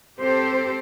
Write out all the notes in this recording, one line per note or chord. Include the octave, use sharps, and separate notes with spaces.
C4 G4 A4 C5